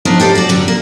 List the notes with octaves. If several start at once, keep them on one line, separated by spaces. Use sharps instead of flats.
F3 B3 D4 D#4
G4 A4 C5 F5
F#4 D5
F#2 D3
A#3